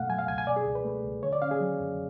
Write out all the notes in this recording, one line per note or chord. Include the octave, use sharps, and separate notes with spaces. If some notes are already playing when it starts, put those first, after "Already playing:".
Already playing: F#2 B2 A3 F5 F#5
F#3 G#5
F5
C#2 G#5
G#5
B2 D5
G#4
C#2
B4
A3
C#2
D3 C#5
D5
C#4 F5
G#4
F#3
F#2